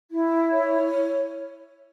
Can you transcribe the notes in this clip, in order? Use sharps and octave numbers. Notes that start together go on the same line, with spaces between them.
E4
C#5